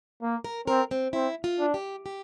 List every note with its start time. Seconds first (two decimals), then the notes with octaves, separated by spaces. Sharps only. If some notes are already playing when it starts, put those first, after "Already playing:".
0.22 A#3
0.44 A#4
0.67 C4 A#4
0.91 C4
1.13 C4 E4
1.44 F4
1.59 D4
1.74 G4
2.06 G4